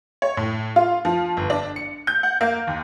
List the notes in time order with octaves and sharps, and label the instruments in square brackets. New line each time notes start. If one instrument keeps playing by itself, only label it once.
[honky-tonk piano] C#5
A2
F4
F3
G1
D4
C#7
G6
F#5
A#3
D#2